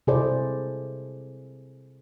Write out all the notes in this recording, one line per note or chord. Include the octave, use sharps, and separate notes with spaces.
C3 E4 G#4 A4 C5 D5